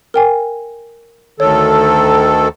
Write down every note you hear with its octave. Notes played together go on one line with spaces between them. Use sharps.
A#4 G5 G#5
D2 D#3 A4 C#5